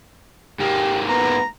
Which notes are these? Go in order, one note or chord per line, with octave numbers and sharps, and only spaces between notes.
G#2 A#3 G4
B3 A#5